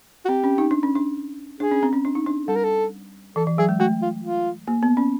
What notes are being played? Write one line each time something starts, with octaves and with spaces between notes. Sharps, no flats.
F#4
C4 G4
C#4
D#4
D4
C#4
D4
D4 G#4
C#4
C4
C#4
D4
D#4
D4
G3 A4
A#4
A4
E3 A4
E3
F#3 G#4
G#3
A3 F#4
F4
F4
A#3
B3
C#4